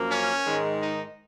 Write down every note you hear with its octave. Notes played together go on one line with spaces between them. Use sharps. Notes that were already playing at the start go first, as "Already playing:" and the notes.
Already playing: F#2 F3 A#3
C#4
G#2 D#3 G#3
D#4